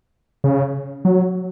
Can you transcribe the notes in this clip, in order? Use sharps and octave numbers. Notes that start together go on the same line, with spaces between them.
C#3
F#3